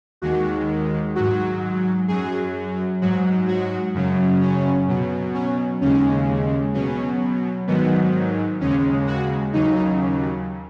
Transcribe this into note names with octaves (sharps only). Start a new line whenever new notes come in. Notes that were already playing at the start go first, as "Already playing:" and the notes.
D#2 D#3 G#3 F#4
G#2 F#3 F#4
F#2 F#3 G#4
G#2 F#3 F#4
F#4
F#2 C#3 F#3
C#4
B2 F#3
C#4
D#2 C#3 G#3 C#4
B2 F#3 C#4
G#2 D#3 F#3 B3
D#2 C#3 G#3 C#4
F#4
D#2 C#3 F#3 D#4